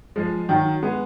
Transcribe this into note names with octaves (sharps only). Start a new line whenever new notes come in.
F3 G#3
D#3 F#3
G#3 B3